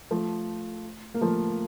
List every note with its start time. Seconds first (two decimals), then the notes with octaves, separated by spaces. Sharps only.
0.11 F3 A3
1.14 A#3
1.21 F3 A3